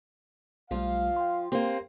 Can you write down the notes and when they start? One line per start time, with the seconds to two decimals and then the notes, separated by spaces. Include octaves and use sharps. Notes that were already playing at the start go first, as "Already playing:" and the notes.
0.71 B1 F3 G3 A3 F4 F5
1.17 G5 C6
1.52 A#3 C4 G4 A#4 C6